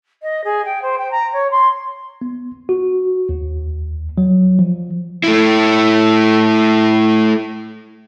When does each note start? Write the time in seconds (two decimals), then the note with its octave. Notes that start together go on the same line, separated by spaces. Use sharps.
0.23 D#5
0.44 G#4
0.65 G5
0.82 C5
0.98 G5
1.11 A#5
1.33 C#5
1.51 C6
2.21 B3
2.69 F#4
3.29 D#2
4.18 F#3
4.59 F3
5.24 A3 E4